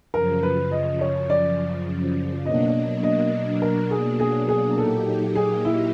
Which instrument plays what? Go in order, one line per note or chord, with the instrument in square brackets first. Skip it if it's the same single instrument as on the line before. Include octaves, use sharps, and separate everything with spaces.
[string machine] F#2 C#3 F3 [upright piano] A#4
[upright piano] B4
D#5
C#5
D5
[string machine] B2 F#3 A#3 D4 [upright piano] D#5
[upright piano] D#5
A#4
G#4
G#4
G#4
[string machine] A#2 F#3 A#3 D#4 G4 [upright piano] A4
[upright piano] G#4
E4